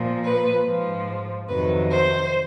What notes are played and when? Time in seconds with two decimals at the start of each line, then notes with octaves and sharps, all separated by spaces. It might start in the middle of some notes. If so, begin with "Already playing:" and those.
Already playing: A#2 F3
0.25 B4
0.66 G#2 F3
1.49 F2 C3 D#3 F#3 B4
1.91 C5